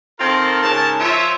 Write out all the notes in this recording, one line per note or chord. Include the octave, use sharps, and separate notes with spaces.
D#3 C4 F4 A4 A#4 C6
G#2 C#3 A#4 A5
F3 F4 C5 C#5 E5